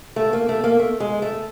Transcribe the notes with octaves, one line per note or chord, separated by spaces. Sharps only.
A3
A#3
A3
A#3
A3
G#3
A3